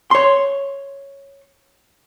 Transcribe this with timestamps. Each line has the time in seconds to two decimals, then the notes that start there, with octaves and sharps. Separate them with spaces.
0.11 C#5 C6